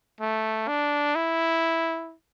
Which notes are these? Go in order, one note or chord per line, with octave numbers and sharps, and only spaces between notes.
A3
D4
E4